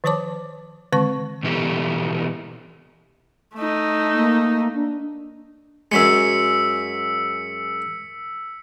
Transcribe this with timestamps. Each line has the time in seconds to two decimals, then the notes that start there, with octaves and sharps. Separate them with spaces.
0.04 D#3 F3 C5 C#5 A5 D6
0.92 D3 D#3 G#3 C4 A5 C#6
1.43 B2 E3 B3 E4 G4 A4
3.54 A3 D#4
4.13 A#3
4.74 D4
5.92 F#2 F#3 G#3 E6 B6 C#7